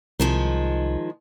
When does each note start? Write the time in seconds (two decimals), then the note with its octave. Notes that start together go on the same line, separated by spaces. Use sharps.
0.20 C2 D#3 F3 G#3